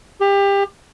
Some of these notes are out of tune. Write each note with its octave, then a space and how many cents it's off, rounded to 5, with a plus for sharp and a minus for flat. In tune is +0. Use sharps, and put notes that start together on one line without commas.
G4 +25